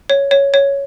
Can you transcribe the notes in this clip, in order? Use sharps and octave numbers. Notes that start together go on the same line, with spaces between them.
C#5
C#5
C#5